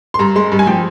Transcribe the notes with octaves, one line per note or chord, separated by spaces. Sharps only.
C6
G2 A#5
G#3 C6
G2
G#5
F3 G5